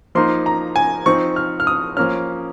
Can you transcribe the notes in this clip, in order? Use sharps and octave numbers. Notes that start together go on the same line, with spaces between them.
F3 A#3 D#4 C6
A#5
G#5
F3 C4 D#4 C#6
F6
F6
D#6
F3 A#3 C#4 F6